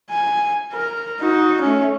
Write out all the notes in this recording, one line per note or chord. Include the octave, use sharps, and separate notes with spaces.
G#5
A#4
D#4 F#4
A3 C#4